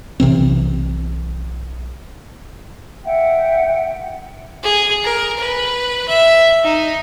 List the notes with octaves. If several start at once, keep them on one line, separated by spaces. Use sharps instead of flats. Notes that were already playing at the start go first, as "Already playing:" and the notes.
B1 C3 E3 C4
E5 F#5 G5
G#4
A#4
B4
E5
D#4